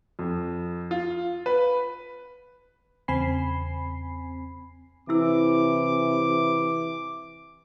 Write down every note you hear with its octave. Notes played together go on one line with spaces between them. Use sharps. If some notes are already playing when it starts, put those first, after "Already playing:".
F2
F4
B4
E2 C#3 C4 G#5 B5 C7
C3 E3 E4 A4 D6 E6